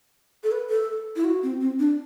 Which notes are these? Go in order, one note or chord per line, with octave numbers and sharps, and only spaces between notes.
A4
B4
A4
E4
F#4
C4
C4
D4